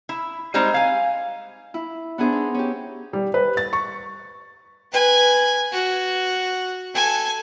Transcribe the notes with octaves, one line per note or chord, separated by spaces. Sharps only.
E4
G3 G#3 C4 D#4 E4
F5 G#5
E4
B3 D4 E4 G#4 C5
D#4
C#4 G4
G3
B4
A6
C#6
B4 G#5
F#4
A4 G#5